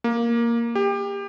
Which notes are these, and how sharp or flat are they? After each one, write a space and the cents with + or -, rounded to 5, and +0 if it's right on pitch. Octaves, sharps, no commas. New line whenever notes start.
A#3 +5
G4 +25